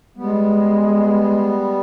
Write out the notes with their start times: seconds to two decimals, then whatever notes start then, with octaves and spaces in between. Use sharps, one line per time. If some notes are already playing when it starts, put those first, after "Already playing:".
0.16 G3 G#3 B3